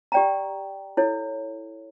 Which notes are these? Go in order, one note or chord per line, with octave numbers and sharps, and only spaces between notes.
G4 D5 G5 A#5
E4 A4 C#5